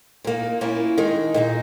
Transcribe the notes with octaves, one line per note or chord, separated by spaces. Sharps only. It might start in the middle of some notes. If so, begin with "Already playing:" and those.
A#2 A#3 D#4
A#2 A#3 C#4 E4
D#3 G#3 D#4
A#2 A#3 D#4